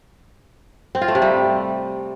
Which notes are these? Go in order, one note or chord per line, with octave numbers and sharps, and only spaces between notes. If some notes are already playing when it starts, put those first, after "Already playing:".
C4
F4
A3
C3
G3